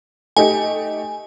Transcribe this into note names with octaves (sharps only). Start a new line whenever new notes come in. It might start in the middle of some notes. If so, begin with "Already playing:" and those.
A3 D#4 G4 G#5